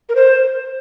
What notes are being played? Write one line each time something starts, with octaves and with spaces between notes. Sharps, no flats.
A#4
C5